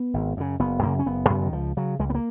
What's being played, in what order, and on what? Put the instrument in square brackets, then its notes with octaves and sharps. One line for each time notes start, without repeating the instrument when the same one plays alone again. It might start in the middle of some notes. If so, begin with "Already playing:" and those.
Already playing: [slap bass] B3
G#1
F#2 C#3
F#1 B3
F#2 C#3 A#3
C#4
F#1 B3
F#2 C#3 B3
D#3
C#2 F3
C#3 F#3
C#2 G#3
B3
A#3